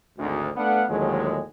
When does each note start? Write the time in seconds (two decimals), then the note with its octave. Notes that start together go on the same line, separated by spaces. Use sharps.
0.18 G#1 D2
0.56 A3 B3 D4 B4 F5 F#5
0.89 D#2 A2 D3 F3 F#3 G#3